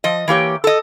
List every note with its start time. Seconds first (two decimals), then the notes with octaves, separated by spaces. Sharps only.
0.04 F3 D#5
0.28 E3 A#3 G4 C#5
0.64 A4 D#5